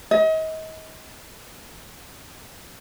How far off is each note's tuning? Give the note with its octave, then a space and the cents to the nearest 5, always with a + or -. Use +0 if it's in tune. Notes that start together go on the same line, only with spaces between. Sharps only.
D#5 +35